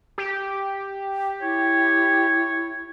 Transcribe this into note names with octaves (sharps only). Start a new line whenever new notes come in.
G4
E4 C#5